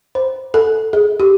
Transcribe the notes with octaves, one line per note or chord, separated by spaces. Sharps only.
C5
A4
G#4
G4